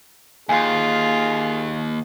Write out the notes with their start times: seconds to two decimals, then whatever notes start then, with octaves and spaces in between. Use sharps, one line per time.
0.49 D#2 F4 G#4 G#5